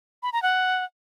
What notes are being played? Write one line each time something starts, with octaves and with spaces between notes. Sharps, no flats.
B5
A#5
F#5